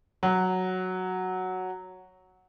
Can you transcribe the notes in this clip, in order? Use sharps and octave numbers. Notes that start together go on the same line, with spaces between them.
F#3